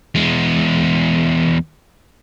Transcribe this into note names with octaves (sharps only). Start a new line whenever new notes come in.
E2 G#3